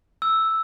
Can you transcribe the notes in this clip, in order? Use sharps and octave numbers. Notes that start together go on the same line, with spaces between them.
E6